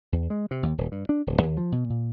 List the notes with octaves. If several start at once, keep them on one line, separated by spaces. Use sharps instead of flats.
E2
G#3
C3
D#2
D#1
G2
D4
D1
D#2
F3
B2
A#2